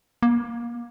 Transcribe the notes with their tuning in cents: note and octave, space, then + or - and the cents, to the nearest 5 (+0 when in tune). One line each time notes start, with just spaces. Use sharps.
A#3 +25